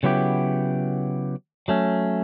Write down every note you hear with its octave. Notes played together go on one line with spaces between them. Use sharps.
C#3 F#3 B3 E4 G4
F#3 A3 C#4